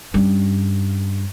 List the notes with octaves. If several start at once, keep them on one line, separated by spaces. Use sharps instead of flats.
G2 C#4